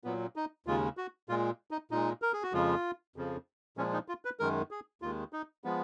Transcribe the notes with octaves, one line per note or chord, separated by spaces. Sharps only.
A#2 F#3 B3
D#4
D#2 C#3 G#3 F4
F#4
A#2 G#3 F4
D#4
A#2 G#3 D#4
A#4
G#4
F#4
F2 C#3 F3 G#3 F4
F2 C#3 F3
A#2 F3 G#3 C#4
D#4
F4
B4
F#2 D#3 G#3 A#4
G#4
D#2 D#3 G#3 F4
D#4
F3 G#3 B3